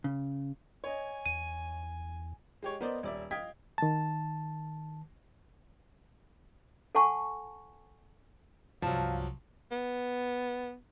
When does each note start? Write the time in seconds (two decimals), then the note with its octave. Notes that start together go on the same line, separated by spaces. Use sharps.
0.04 C#3
0.84 C#5 D#5 G#5
1.26 E2 D#7
2.62 G#3 G4 C#5
2.81 B3 A#4 C5 D5 D#5
3.03 D#1 D5 E5
3.31 D#5 F5 G5 D#6 G#6 B6
3.78 D#3 A5
6.95 A4 F#5 G#5 A5 C#6
8.82 C2 G2 F3 F#3 F5 A5
9.71 B3